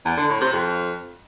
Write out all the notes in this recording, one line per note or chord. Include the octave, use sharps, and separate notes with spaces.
E2
D3
A2
C3
F2